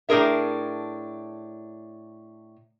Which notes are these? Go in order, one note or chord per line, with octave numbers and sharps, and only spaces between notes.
A2 D4 G#4 A#4 E5